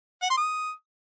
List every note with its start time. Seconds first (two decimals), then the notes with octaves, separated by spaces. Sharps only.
0.23 F#5
0.30 C6
0.38 D#6